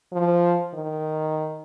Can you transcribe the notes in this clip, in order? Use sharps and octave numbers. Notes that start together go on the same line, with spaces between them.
F3
D#3